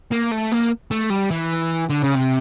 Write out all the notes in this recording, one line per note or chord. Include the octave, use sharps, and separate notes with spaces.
A#3
A3
A#3
A3
G3
E3
D3
C#3
C3